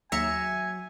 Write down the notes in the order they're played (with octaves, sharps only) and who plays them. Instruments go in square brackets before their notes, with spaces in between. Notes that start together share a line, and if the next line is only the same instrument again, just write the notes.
[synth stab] D#2 A#5 C#7 [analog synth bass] F#3 [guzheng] E5 [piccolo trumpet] G#5